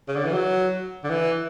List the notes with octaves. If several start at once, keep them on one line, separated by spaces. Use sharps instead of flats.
C#3
D3
E3
F#3
D3
E3